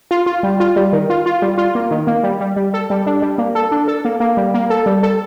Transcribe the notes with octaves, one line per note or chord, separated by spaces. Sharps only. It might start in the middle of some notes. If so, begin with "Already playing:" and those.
F4
F4
G3
F4
G3
D#3
F4
F4
G3
F4
A#3
D#3
A#3
G3
G3
G3
A4
G3
D4
G3
A#3
A4
D4
A4
A#3
A#3
G3
A#3
A4
G3
A4